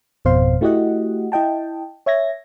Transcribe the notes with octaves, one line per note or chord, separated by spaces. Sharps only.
G#1 F2 B2 C5 F5 C6
A3 E4 F#4 G4 D#5 F#5
E4 D#5 G5 A5
C#5 E5 G#6 A#6